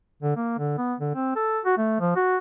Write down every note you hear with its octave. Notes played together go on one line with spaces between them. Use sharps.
D3
A#3
D3
B3
D3
C4
A4
F#4
A3
F3
F#4